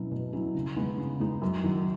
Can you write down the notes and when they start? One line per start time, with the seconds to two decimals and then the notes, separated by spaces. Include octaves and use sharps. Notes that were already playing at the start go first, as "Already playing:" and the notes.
Already playing: B2 F#3 C#4 E4
0.11 B2
0.33 F#3 C#4 E4
0.55 C#3
0.76 G#3 B3 D#4
0.98 C#3
1.20 G#3 B3 D#4
1.42 F#2
1.64 D#3 F#3